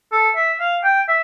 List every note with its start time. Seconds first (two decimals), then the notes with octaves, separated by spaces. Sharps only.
0.12 A4
0.36 E5
0.60 F5
0.84 G5
1.08 E5